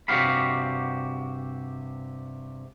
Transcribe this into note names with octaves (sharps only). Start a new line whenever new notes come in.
G2 C3 F#4 G4 F5 B5